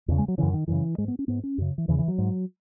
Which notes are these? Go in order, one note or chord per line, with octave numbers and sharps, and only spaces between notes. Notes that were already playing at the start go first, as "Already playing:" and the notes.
E2 C#3
G#3
F#3
F#2 C#3 E3
D#3
F#2 C#3 E3
G#2 G#3
B3
C#4
G#2 B3
C#4
F#2 C#3
E3
E2 C#3 E3
E3
F#3
G#2